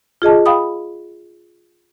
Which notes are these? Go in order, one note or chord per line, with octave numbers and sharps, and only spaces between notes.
F4 G#4 D#5 A5
F5 G5 B5 D#6